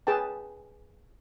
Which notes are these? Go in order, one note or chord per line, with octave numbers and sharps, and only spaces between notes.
G#4 B4 G5 A5